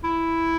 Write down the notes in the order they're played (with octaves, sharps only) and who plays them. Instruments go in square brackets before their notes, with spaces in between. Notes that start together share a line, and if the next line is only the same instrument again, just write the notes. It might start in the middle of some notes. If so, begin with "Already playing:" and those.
[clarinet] E4